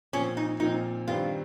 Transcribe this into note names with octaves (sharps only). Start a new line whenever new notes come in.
A#2 F3 C4 C#4
D#4
A#2 F3 C4 D#4
G2 D#3 G3 C4 F4